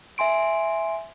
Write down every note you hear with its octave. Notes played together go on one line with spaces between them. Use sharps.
E5 G#5 C6 D7